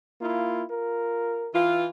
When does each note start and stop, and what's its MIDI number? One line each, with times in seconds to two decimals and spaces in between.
0.21 0.64 58
0.21 0.64 64
0.21 0.64 65
0.70 1.52 65
0.70 1.52 70
1.54 1.86 52
1.54 1.86 65